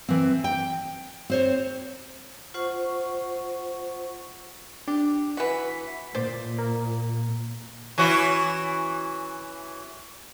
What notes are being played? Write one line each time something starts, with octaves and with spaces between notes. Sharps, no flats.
E3 C4
G5
C4 C5 C#5
F4 C5 F#5 C#6
D4 G4
E3 F#4 B6
A#2 C5 D5
A#3
E3 C#4 F#4